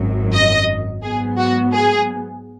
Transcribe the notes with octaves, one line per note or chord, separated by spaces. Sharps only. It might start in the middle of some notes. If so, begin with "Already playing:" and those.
Already playing: G#1 F#2 F#3
D#5
G#2 F#3 B3 G#4
F#4
G#4